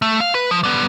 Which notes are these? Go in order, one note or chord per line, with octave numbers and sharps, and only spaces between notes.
A3
F5
B4
F3
G3 B3